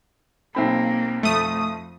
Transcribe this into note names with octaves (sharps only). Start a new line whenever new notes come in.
B1 A#3 C4 B5
F2 A3 D#6